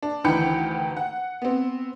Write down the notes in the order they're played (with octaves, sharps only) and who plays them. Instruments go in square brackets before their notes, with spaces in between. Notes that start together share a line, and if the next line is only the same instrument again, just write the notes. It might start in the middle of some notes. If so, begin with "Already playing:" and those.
[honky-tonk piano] D4
D2 D#3 E3 G5 B5 C#7
F#5
B3 C4